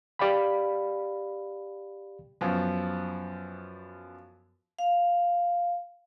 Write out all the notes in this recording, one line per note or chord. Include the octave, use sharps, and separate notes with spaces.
G4 D5 F5 G5 B5
F#2 F3 B3
F5